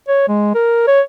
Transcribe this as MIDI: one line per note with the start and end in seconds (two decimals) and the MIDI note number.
0.08 0.25 73
0.28 0.50 56
0.55 0.86 70
0.87 1.01 73